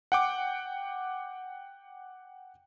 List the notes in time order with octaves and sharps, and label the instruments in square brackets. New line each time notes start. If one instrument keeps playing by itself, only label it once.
[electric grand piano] F#5 G5 D6